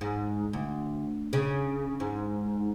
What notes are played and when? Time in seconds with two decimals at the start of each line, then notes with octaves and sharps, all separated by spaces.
0.01 G#2
0.53 D2
1.33 C#3
2.00 G#2